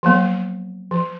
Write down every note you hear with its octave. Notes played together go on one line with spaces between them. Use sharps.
F3 F#3 A#3 B3
F3